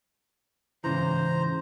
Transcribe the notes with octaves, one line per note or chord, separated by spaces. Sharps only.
G#2 C#3 E3 C5 A#5